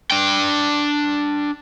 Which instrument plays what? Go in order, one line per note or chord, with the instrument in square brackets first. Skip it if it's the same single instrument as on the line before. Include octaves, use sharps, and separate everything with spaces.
[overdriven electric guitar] D4 G5